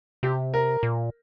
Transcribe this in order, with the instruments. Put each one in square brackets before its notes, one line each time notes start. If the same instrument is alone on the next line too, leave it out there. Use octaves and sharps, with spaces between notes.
[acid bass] C3 [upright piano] G4
[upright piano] A#4
[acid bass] A#2